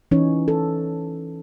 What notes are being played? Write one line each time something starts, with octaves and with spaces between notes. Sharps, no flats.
E3 C#4 D#4 C#5
A4